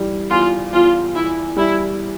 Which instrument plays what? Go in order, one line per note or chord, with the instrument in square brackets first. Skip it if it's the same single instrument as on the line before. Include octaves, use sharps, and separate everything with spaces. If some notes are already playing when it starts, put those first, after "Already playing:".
Already playing: [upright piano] E3 G3
[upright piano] E2 [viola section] F4
[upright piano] E2 [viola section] F4
[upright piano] E3 [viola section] E4
[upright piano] G3 [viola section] E4